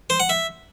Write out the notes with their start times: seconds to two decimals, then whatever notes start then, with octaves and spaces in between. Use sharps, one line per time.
0.10 C5
0.20 F#5
0.29 E5